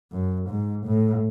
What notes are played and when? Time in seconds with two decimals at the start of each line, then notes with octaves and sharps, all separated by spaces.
0.12 F#2
0.49 G#2
0.86 A2